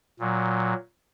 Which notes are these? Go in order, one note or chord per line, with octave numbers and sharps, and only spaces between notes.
A#2 F#3